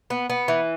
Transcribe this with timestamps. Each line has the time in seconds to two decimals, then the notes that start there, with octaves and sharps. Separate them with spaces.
0.10 B3
0.30 B3
0.48 E3